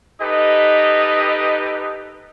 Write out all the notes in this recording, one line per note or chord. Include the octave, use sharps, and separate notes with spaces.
D#4 G4 A4 B4 D#5